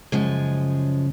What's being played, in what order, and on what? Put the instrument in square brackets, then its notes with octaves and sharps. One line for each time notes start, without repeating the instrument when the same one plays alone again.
[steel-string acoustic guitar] F#2 F3 G#3 [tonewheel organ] C#3